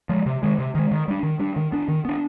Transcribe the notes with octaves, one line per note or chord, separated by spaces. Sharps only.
F3 G#3
C3
D#3 G#3
C3
D#3 G#3
D#3
G3 D4
D#3
G3 D4
D#3
B3 D4
D#3
B3 D4